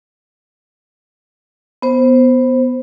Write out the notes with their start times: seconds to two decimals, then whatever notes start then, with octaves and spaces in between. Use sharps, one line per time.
1.82 B3 C5